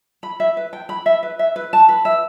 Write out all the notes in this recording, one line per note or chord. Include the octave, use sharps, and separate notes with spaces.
B5
E5
B4
G5
B5
E5
B4
E5
B4
A5
B4
E5